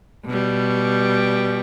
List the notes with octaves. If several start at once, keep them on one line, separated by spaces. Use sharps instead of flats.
B2 G3